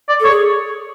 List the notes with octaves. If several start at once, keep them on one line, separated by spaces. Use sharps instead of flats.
D5
A4 C#5
G#4